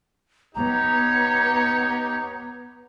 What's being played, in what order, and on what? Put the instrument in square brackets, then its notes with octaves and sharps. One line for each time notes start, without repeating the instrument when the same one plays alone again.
[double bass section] B3 [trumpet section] D#4 G4 C#5 [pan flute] A#5